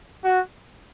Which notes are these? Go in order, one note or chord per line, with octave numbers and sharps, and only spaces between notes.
F#4